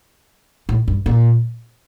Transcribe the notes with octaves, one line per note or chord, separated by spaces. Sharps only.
A2
G2
A#2